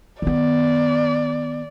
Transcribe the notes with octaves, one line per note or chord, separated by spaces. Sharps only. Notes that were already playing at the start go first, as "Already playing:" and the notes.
D#3 B3 D5